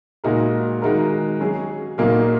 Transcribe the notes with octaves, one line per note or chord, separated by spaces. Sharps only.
A#2 G#3 D#4 F#4 A#4
D#3 G#3 D#4 F#4 A#4
F#3 C#4 G#4
A#2 F#3 A#3 D#4